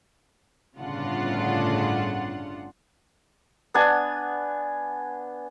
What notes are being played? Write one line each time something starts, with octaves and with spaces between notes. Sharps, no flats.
G1 A2 C#3 D4 F4 F#5
B3 D4 G#5